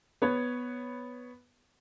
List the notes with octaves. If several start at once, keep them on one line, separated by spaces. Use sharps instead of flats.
B3 B4 C#5